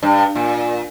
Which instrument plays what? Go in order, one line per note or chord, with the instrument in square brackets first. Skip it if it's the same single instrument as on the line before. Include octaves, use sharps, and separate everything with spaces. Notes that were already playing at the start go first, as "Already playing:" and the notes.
[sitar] G2
A#2